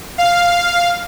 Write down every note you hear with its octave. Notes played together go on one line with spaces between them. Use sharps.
F5